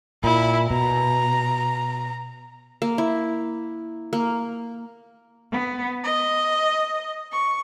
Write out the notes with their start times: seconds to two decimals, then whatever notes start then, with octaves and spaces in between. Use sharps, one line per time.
0.24 A#2 E4
0.71 B2 A#5
2.82 A#3
2.98 E4
4.13 A#3
5.52 B3
6.04 D#5
7.32 C#6